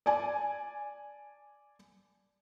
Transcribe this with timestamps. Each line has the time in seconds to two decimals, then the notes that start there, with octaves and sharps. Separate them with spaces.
0.06 D5 G#5 A5